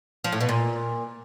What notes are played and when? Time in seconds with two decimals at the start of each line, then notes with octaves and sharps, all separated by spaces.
0.24 F3
0.32 A2
0.41 B2
0.49 A#2